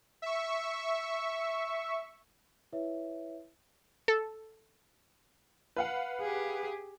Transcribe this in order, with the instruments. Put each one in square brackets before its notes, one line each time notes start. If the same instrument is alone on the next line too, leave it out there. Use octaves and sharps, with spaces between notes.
[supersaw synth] E5 C#6
[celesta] E4 B4 C#5 E5
[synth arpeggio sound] A4
[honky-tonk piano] B4 F5 F#5
[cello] G4 G#4